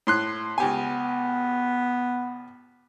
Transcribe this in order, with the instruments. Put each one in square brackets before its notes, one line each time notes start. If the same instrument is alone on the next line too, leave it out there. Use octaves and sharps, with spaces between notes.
[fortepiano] A2 C6 F#6
[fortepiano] C#2 G4 G#5 [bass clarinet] B3